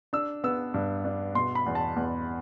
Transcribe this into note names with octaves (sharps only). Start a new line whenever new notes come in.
D4 E6
B3 E6
G2
D4
B2 C6
B5
E2
A5
E2